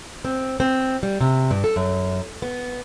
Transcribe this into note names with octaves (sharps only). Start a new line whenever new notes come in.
C4
C4
G3
C3
G2
A4
F#2
B3